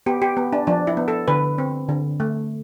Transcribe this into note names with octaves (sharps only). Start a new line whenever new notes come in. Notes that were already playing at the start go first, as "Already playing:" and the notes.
B3 G4
G4
B3
D4
F3 D4
E4
B3
A4
D3 B4
C4
D3
A3